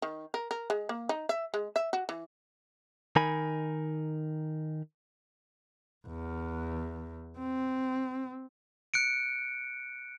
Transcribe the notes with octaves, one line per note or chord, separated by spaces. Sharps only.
D#3
A#4
A#4
G#3
A#3
D#4
E5
G#3
E5
F#4
E3
D#3 D#4 A#4 G#5 B5
E2
C4
F#6 C#7 D7